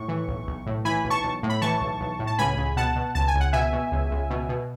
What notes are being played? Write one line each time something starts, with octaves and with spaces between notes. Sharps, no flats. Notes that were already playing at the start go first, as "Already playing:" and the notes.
Already playing: A2 C#6
E3
B1
B1
A2
E3 G#5 B5
B1
A5 C#6
B1
A2
B5
E3 A5 C#6
B1
B1
A2
A5
C#2 G#5 B5
C#2
B2 F#5 A5
B2
C#2 A5
G#5
C#2
F#5
B2 E5 G#5
B2
C#2
C#2
B2
B2